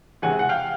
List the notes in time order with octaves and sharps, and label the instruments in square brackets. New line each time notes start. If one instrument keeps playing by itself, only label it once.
[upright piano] E2 C3 E3 G#3 F#5 G#5
F#5
F5 G5